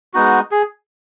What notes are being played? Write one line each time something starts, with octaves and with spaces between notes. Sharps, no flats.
G#3 B3 D#4 F#4
G#4